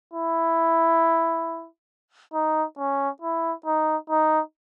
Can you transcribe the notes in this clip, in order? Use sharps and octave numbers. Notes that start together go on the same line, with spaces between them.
E4
D#4
C#4
E4
D#4
D#4